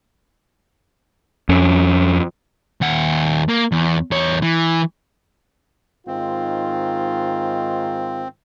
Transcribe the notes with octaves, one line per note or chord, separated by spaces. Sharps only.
F2 C#4
D#2 F#5
A#3
E2
E2 C#5
E3
G#2 D#3 C4 F4